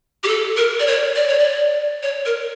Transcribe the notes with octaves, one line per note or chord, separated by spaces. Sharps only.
G4
A4
A#4
D5
C#5
D5
C#5
D5
C#5
A#4